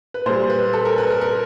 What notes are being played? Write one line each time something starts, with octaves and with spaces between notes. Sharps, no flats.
B4
A#2 G3 C5
B4
A4
A#4
B4
A#4
A#4